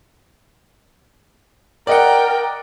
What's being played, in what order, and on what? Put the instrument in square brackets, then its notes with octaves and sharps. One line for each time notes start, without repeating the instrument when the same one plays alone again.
[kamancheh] A#4 G5 [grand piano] D5 D#5 F#5